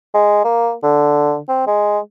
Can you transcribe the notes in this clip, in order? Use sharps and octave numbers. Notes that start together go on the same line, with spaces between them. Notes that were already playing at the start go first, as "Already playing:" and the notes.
G#3
A#3
D3
C4
G#3